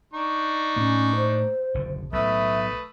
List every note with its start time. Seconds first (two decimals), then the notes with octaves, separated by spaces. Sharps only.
0.13 D4 D#4 C#6
0.76 A2 A#3 C#4
1.15 C5
1.74 F#1 B1 D3
2.13 B1 A2 A3 B4 E5 D#6